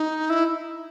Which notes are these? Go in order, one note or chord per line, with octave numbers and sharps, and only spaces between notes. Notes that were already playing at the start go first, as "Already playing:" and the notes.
Already playing: D#4
E4